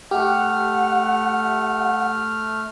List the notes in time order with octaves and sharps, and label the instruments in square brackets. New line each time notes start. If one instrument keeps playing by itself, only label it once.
[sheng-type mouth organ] A3 F6 [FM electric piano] G4 [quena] F#5